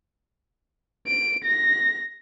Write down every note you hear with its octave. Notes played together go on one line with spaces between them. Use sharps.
D7
A#6